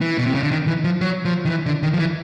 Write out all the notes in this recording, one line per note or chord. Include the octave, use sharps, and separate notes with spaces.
E3
B2
C3
C#3
D3
D#3
E3
F3
F#3
F3
D#3
E3
D3
D#3
F3
E3